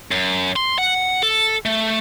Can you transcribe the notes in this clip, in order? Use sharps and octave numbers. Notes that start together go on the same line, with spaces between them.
F#2
C6
F#5
A4
A3